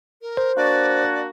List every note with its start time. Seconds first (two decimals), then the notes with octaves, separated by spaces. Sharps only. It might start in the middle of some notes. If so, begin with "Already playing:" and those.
0.22 A#4
0.37 C5
0.57 A#3 D4 F#4 D5